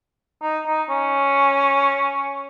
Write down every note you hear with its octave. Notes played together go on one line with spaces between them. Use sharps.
D#4
D#4
C#4